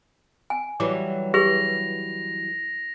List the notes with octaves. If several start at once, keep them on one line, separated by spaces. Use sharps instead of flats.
G#5
E3 F#3 G3 D6
G4 G#4 B4 A#6 F7